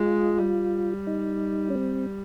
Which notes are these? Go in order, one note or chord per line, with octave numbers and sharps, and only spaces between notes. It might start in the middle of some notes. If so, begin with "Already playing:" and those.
Already playing: G#3 F4
G3
D#4
C#4
C4